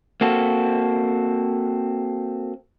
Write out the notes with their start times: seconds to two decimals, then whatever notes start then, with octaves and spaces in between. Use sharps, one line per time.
0.21 A#3 C4 F#4 A4